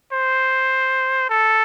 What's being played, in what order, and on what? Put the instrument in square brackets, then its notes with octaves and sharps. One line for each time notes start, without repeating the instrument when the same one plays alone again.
[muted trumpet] C5
A4